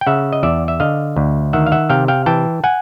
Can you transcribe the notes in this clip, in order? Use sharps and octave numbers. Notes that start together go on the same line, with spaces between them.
G5
C#3 E5 F#5
D#5
E2 D5 E5
E5
D3 D#5 F5
D2
D#3 E5 F#5
F5
E5 F#5
C3 F5 G5
F5 G5
E3 G5 A5
F#5 G#5